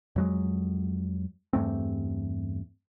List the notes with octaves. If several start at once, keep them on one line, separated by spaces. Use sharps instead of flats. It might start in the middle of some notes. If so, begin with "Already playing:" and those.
F2 F#3 G#3
E2 G2 A3 C4